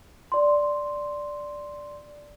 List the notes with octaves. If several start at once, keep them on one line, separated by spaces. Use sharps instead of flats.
D5 C6